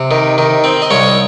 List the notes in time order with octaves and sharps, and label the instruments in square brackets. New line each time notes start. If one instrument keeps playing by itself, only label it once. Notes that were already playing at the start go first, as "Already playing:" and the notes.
Already playing: [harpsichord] C3
D#3
D#3
C4
D#5
C2 C#5